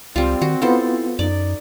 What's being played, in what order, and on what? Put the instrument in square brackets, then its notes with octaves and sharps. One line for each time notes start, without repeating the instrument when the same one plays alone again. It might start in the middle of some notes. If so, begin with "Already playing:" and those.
[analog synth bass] C#2 [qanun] G3 F4 [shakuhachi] C4
[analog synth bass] D#3 [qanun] F#4
[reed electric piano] B3 F4 [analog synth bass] E4 [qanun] A4 C5
[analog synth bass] F#2 [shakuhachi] D#4 [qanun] D5